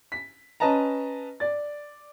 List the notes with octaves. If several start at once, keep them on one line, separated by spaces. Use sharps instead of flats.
B6
C#4 B4 D#5 A5 A#5
D5 A6